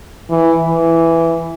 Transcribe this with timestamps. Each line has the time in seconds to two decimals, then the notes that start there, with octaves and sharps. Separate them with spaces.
0.30 E3
0.65 E3